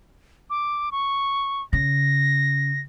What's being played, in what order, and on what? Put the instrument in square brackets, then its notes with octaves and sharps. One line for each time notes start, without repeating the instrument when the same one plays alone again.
[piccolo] D6
C#6
[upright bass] C#3 [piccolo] A#6